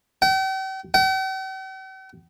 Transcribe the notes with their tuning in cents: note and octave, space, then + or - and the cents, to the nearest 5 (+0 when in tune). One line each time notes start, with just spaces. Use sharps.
G5 -40
G5 -45